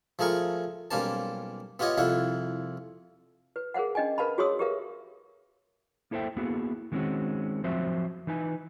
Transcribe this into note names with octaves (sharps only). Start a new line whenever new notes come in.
F3 A3 G#4 A#4 C#6
B1 G3 A#3 C#4 C5 A5
B3 F4 G4 C#5 D#5
C2 F2 E4 F4 F#5
B4
G#4 A#4 C5 F5 F#5
C#4 D4 D#5 G5 G#5
A#4 B4 F5 A5 B5
F#4 G#4 C#5 C6 D#6 E6
G4 G#4 A#4 B4 E5 F5
A#3 E4 A4 C5 E5 G5
A#3 B3 E4 F#4 G#4
D#3 G#3 A3 C4 C#4 F#4
F3 F#3 C4 F#4 C5 E5
E3 D#4 B4 G#5